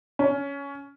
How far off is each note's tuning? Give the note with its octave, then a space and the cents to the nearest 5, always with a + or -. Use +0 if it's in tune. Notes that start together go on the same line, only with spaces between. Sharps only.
C#4 +15